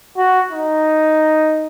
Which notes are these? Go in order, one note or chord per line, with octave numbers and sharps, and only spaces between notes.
F#4
D#4